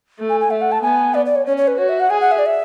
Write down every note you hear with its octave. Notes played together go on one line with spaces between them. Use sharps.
A3
G#5
G#5
A3 E5
F#5
A5
B3 G#5
D5
D5
C#5
C#4 C#5
C#5
B4
F#4 C#5
E5
F#5
G#4 G#5
F#5
E5
D5
E5